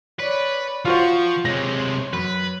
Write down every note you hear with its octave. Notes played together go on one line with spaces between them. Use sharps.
B4 C#5 D5
F3 F4 F#4 C5 C#6
C3 G#3 C5 C#5 A#6
F#2 B4